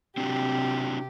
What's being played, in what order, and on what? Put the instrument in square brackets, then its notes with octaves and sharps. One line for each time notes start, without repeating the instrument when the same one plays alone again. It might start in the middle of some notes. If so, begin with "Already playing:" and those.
[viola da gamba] C3 G4 [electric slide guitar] C4 D4 F#4